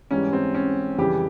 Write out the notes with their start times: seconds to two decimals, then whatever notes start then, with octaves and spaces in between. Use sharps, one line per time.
0.11 G#2 E3 G3 C#4
0.33 C4
0.54 C#4
0.98 F2 C#3 E3 G3 G4